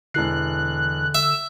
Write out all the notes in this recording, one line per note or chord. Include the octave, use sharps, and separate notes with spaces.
E1 D3 E3 F#6 C7
E5 E6